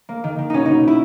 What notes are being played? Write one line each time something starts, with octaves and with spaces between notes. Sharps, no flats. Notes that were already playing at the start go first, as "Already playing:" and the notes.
A#3
D#3
D#3
B2 C#4 D#4
B2 D#4
B2 E4